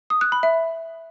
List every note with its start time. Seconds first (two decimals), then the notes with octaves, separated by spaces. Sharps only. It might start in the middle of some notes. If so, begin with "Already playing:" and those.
0.10 D#6
0.21 F#6
0.32 B5
0.43 E5